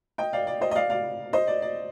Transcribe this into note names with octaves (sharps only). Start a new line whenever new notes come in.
D#5 G5
D5 F5
D5
C5 D#5
D#5
D5 F5
D5 F5
C5 D#5
D5
D5